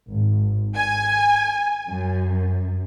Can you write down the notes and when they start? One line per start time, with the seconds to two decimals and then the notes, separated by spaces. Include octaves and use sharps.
0.10 G#1
0.76 G#5
1.89 F#2